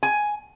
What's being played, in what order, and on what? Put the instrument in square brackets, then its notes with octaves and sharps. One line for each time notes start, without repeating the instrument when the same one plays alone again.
[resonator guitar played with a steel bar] G#5